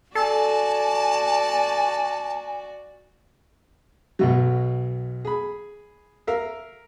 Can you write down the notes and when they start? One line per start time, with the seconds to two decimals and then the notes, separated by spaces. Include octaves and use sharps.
0.15 F#4 A4 D5 G#5 A5
4.19 B1 B2 F#3
5.25 G#4 B5
6.27 A#4 E5 F5